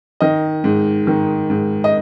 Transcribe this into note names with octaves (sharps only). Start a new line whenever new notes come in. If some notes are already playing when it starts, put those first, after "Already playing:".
D#3 D#5
G#2
D#3
G#2
D#5